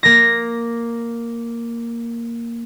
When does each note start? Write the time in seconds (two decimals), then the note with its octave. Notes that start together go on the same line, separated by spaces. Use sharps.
0.03 A#3 A#6